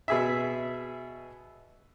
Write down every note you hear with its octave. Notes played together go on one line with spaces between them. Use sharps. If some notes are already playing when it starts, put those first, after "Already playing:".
B2 G#4 E5